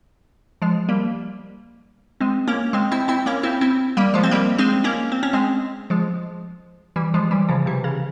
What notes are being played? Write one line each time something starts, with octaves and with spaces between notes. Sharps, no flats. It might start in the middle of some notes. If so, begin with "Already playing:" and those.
F3 G#3
G3 A#3
G#3 C4
A#3 C#4
G#3 C4
C4 E4
C4 E4
A#3 C#4
C4 E4
C4 E4
G3 A#3
F3 G#3
C4
G3 A#3
G#3 C4
A#3 C#4
C4
C#4
G#3 C4
F3 G#3
E3 G3
F3 G#3
E3 G3
C#3 F3
C3 E3
C#3